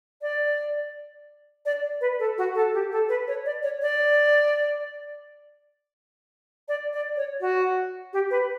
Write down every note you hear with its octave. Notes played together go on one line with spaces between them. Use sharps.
D5
D5
B4
A4
F#4
A4
G4
A4
B4
C#5
D5
C#5
D5
D5
D5
C#5
F#4
G4
B4